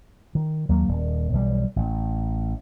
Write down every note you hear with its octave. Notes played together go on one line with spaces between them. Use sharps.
D#3
D#2 F#3 A#3
D#1
B1 E3 G3
A1